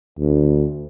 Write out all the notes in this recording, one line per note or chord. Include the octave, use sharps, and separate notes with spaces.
D2